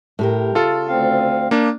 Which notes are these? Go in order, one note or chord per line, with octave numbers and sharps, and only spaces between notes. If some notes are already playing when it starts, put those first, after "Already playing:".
A2 G4 A#4
C#3 F4 A4
D2 C4 F5
A#3 D4